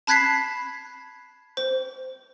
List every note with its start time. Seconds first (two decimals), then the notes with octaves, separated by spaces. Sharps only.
0.07 A5 B5 F#6 G#6 B6 C7
1.57 C5